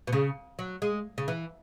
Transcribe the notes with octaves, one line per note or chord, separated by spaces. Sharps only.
B2
C#3
F#3
G#3
C#3
E3